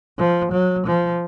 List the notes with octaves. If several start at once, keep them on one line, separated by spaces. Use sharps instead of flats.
F3
F#3
F3